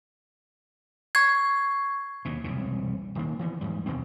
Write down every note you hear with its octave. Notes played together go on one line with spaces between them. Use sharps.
C#6 G#6 C7
D#2 B2
E1 C2 F2 C#3
D1 D#3 A#3
E3 F3 B3
E2 G#2 G3
D#2 B2 D#3 C4